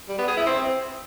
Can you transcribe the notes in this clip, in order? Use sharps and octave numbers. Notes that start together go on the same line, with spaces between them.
G3
B3
G#4
E4
C4